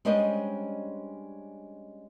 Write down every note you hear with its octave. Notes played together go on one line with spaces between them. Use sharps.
G3 G#3 C#4 D4 C5 D#5